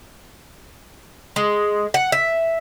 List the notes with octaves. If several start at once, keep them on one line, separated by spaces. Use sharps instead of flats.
G#3
F#5
E5